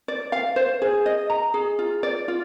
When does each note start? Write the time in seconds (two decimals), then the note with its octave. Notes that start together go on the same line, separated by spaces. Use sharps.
0.08 D5
0.32 F5
0.56 C5
0.82 G#4
1.06 D#5
1.30 A#5
1.54 G#4
1.79 F4
2.03 D5
2.28 F4